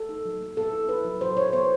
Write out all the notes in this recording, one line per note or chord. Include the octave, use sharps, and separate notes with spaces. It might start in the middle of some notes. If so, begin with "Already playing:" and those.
Already playing: A4
D#4
F#3
A#3
B3 A4
E4
E4 B4
F#3
F#3 C5
E4 C#5
B3 C5